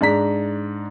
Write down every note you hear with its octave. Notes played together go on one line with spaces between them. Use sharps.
G#2 D4 A#5 B6